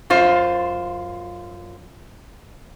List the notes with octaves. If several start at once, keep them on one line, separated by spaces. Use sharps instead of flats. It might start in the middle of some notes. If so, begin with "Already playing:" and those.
F#2 F4 C5